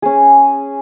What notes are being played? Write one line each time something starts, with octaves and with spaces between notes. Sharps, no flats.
C#4 G#4